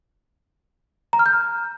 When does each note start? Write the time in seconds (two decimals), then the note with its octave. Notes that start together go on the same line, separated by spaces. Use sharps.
1.13 A#5
1.19 F6
1.26 G6